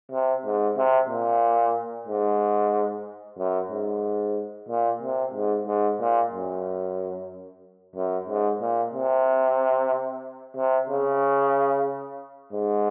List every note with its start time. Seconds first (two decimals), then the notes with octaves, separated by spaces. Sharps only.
0.11 C3
0.45 G#2
0.77 C3
1.09 A#2
2.07 G#2
3.38 F#2
3.71 G#2
4.69 A#2
5.02 C3
5.34 G#2
5.67 G#2
6.00 A#2
6.33 F#2
7.96 F#2
8.29 G#2
8.61 A#2
8.94 C3
10.56 C3
10.89 C#3
12.53 G#2